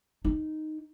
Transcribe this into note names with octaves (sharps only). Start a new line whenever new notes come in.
D#4